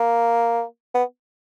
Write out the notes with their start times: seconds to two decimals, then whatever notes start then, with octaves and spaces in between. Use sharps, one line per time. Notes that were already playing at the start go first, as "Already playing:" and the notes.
Already playing: A#3
0.95 B3